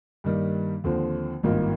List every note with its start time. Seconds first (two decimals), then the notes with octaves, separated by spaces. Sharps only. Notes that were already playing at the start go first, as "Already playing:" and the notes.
0.24 G2 D#3 G3 A#3
0.84 D#2 D3 F3 C4
1.43 G#1 G2 D#3 A#3 F4